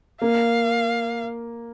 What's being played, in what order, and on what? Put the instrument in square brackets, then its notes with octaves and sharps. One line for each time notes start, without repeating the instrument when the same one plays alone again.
[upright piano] A#3 [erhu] F5